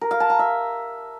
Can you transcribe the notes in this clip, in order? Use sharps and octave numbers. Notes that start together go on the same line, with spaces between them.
A#4
F5
A5
A#5
E5